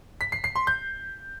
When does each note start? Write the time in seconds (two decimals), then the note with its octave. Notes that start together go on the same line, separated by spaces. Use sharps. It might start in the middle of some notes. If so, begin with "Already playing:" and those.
0.21 B6
0.32 C7
0.44 C7
0.56 C6
0.67 G6